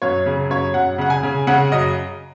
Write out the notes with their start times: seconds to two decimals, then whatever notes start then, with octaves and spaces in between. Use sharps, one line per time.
0.02 F#2 C#5
0.26 C#3
0.50 F#2 C#5
0.74 F#2 F#5
0.98 C#3 F#5
1.10 G#5
1.23 C#3
1.47 C#3 F#5
1.72 F#2 D#5